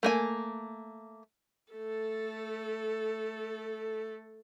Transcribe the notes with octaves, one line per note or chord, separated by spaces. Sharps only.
A3 A#3 G#5
A3 A4